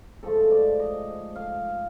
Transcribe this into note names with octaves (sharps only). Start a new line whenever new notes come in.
G#2 F3 A3 A4
D5
D#5
F5